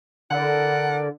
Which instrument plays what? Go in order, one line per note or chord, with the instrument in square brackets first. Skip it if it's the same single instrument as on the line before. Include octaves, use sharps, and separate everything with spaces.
[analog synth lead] D3 [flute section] E4 A#4 D5 [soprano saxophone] F#5